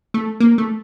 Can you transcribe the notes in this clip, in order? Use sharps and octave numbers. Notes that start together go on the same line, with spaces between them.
A3
A#3
A3